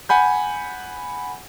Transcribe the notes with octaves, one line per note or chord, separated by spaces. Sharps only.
F#5 G#5 B5 G6